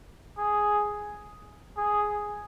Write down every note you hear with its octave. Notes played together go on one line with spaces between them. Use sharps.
G#4
G#4